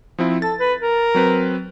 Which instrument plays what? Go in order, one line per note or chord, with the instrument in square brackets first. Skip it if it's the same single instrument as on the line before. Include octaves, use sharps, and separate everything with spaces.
[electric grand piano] F3 C4 E4
[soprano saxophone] A4 [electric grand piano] A6
[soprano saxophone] B4
A#4
[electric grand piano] F#3 C4 B4